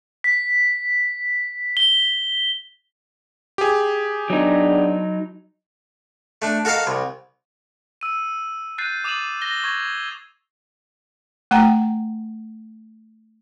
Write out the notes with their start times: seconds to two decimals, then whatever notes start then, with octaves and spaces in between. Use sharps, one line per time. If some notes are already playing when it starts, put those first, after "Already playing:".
0.24 B6
1.77 G7
3.58 G4 G#4
4.30 F#3 B3 D4 D#4
6.42 A3 D4
6.65 F#4 A4 A#4 D#5 F5
6.87 C2
8.01 E6 D#7
8.78 F#6 G6 A6 C7 D#7
9.04 D6 D#6 A6 D#7 E7 F#7
9.42 A#6 G7
9.64 C#6 G#6
11.51 A3 F#5 G5 A#5